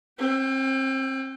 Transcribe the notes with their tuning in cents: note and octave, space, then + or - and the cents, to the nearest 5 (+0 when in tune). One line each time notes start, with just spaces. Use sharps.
C4 +30 G5 -20